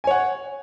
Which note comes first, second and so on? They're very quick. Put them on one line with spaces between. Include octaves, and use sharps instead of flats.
G#5 C#5 F#5